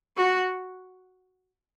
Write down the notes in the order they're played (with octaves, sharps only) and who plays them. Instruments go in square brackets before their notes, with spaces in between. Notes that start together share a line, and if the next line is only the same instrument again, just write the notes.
[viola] F#4